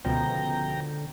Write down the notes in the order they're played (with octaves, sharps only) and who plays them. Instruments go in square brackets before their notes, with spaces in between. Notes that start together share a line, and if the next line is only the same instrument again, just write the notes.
[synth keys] C#2 B2 F3 [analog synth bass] D3 [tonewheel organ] G5 A#5